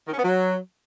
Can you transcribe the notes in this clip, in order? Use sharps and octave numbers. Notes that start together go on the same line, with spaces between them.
D#3
C#4
B3
F#3